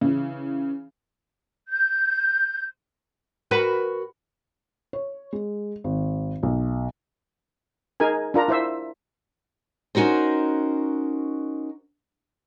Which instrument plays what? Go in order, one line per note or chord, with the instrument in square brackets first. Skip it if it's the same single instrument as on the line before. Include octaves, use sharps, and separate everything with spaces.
[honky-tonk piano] C#3 E3
[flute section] G6
[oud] F#4 A#4 B4
[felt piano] C#5
G#3
G#1
B1
[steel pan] D#4 G#4 A#4 G#5
D4 F4 A#4 A#5
E4 C5 E5
[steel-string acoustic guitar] C#4 D#4 F#4 A#4 C5